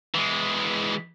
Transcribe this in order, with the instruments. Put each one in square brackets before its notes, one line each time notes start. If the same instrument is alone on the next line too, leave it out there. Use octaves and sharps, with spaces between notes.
[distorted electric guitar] E3 G#3